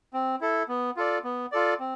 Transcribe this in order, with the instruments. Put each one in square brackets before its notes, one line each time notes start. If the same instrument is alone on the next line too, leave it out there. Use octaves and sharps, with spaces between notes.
[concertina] C4
E4 A4
B3
F4 A4 D5
B3
F4 A4 D5
C4